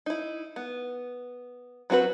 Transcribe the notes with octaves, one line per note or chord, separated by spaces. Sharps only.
D#4 E4
B3
F#3 C4 F#4 B4